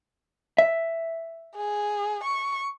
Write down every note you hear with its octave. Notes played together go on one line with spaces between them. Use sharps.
E5
G#4
C#6